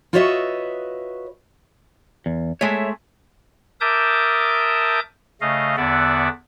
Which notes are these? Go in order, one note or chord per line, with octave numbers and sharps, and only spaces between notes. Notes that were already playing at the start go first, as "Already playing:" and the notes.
F4 F#4 B4 C#5 D#5 E5
E2
G#3 A3 C#5 D#5 E5
A#4 E5 A5 D6 D#6 G6
C#3 A3 D#5 F5
E2 D3 B3 D5 E5 F#5